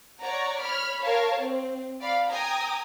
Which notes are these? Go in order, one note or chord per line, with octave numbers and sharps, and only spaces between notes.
C#5 D5 F#5 A#5
C#5 B5 F6
A#4 C#5 F5 A5
C4
D5 F5 B5
G5 G#5 A#5 D#6